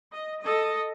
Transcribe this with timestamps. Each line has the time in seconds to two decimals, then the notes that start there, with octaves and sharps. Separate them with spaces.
0.12 D#5
0.43 A4 D#5